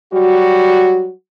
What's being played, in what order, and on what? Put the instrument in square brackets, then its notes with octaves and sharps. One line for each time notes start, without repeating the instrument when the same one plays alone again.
[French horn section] F#3 G3 F#4